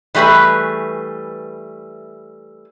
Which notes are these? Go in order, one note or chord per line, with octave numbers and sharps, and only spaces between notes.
E3 G3 A3 G#4 B4